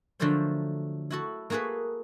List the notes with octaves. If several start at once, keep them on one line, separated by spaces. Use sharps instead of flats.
D3 F3 F#3 A3 A4 C5
E4 F#4 A4
A#3 F#4 G#4 A4 B4